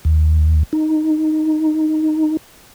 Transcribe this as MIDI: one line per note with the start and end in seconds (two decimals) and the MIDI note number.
0.05 0.63 39
0.73 2.37 63